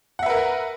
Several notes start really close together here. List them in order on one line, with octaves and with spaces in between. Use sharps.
F#5 E5 B4 A#4